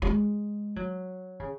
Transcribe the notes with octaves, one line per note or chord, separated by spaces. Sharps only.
F#3
G#3
F#3
C#3